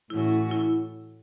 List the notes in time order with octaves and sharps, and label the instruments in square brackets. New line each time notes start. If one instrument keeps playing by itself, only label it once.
[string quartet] A2 E3 A3 C#4 F#4 [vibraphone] E4
[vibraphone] E4